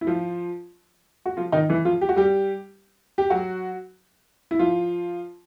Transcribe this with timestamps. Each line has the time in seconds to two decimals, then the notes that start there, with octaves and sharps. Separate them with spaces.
0.01 E4
0.07 F3 F4
1.26 F#4
1.37 F3 F4
1.52 D#3 D#4
1.69 E3 E4
1.85 F3 F4
2.01 G4
2.09 F#4
2.16 G3 G4
3.18 G4
3.30 F#3 F#4
4.51 E4
4.59 F3 F4